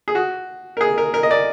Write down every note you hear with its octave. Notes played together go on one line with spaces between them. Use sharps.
G#4
F#4
A#4
G#4
A#4
A#4
D#5
D5